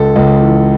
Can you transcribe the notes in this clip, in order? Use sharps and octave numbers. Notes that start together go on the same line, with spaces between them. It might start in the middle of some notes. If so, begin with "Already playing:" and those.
Already playing: C#2 A4
C#2
E3